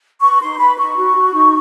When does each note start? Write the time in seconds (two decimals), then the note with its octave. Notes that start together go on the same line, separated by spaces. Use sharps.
0.21 B4 C#6
0.40 D#4 C6
0.59 B4 B5
0.78 D#4 C#6
0.97 F#4
1.16 F#4
1.34 D#4